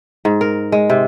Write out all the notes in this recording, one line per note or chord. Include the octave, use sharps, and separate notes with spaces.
G#2
A#4
G#3
C3